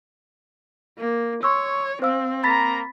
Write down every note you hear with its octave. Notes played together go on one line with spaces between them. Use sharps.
A#3
C#5 C6 C#6 E6
C4 C5 F5 E6
A#3 A#5 B5 A6 B6